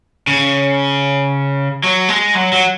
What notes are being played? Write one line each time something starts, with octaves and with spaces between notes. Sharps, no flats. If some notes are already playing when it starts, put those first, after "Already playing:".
C#3
F#3
G#3
F#3
F#3